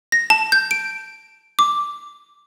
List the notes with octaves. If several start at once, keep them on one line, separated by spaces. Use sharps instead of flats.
A#6
A5
G6
D7
D6